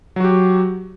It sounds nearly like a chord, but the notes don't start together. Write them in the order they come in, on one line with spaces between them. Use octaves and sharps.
F#3 F#4 G4